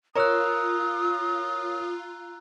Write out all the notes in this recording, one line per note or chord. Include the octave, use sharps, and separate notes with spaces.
F4 A#4 C#5 A#5 D#6 E6 F#6